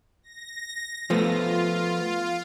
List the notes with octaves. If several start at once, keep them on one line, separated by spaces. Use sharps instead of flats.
A#6
F3 A3 B3 F4